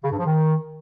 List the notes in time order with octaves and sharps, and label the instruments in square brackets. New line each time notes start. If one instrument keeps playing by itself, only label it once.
[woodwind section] C#3
G2
F3
D#3